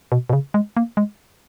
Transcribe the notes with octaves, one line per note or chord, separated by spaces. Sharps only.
B2
B2
C#3
G#3
A#3
G#3